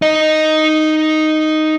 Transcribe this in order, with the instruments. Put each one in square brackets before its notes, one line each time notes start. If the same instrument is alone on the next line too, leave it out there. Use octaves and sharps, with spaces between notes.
[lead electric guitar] D#4 D#5